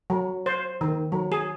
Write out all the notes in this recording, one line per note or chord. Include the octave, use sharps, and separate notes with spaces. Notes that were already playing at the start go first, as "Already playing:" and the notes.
F#3
C5
D#3
F#3
G#4